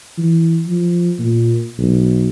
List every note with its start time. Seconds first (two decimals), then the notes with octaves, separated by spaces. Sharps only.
0.18 E3
0.67 F3
1.19 A#2
1.79 B1